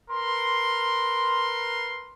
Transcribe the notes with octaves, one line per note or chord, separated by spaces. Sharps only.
A#4 B4 C6